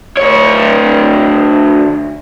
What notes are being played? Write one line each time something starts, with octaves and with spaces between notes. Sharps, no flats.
D2 C#5